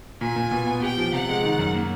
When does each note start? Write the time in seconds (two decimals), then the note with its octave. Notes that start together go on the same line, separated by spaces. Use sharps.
0.21 A#2 G#5
0.36 A#2
0.51 B2
0.67 B3
0.82 G4 G5
0.98 F3
1.13 C3 F#5
1.28 G#3
1.44 D#3
1.59 F#2
1.74 A#3